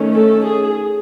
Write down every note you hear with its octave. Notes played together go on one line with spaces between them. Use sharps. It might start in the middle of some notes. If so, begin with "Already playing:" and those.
Already playing: D#3 A3 C#4
A4
G#4